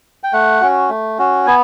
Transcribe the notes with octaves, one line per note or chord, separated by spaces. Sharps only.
G5
A3 F#5
C#4 F#4
A3
C#4 F#4
B3 G#5